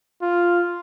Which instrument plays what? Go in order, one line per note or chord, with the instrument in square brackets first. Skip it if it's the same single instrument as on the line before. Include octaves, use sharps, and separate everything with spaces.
[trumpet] F4